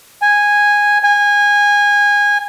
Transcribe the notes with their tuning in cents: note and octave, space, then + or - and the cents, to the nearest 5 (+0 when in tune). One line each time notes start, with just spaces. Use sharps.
G#5 -10
G#5 -20